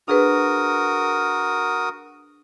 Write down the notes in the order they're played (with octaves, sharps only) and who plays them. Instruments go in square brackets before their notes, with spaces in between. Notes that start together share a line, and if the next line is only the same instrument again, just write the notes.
[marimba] D4 G#4 B4 [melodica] F#4 A#4 D#6